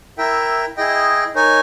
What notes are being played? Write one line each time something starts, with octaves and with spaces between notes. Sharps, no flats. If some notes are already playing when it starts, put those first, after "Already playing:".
E4 A#4 E5 G5
E4 G#4 D#5 G5
D#4 A#4 C#5 G#5